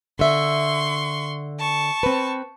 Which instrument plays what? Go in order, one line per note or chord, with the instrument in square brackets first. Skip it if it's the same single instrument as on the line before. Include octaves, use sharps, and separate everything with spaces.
[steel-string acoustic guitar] D3 E5 [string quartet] C6 C#6
[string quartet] A5 C#6
[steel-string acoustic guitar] C4 B4